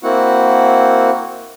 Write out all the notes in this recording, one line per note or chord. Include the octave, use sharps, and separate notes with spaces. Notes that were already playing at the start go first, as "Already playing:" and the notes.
A#3 C4 E4 F#4 F#5